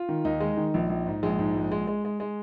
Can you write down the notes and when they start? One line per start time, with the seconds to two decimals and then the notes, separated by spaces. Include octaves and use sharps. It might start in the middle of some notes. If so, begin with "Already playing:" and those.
Already playing: F4
0.09 D#3
0.25 D#2 D#4
0.40 G#3
0.57 D#3
0.74 A#1
0.90 A#1
1.07 G#2
1.23 A#1 G#3
1.39 G#2
1.55 A#1
1.72 G#3
1.87 G#3
2.05 G#3
2.20 G#3